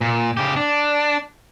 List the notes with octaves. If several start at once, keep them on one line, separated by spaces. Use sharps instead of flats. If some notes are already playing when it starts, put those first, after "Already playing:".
A#2
C#3 G4
D4